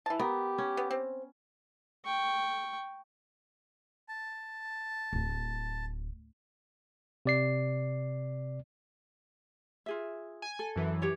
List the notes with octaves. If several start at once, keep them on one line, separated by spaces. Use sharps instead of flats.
E3 A5
B3 G4 A#4
C#4
B3
C4
G5 C#6
A5
D1
C3 D5 C7
F4 G#4 E5
G#5
A4
F#2 E3
G4 C#5 D5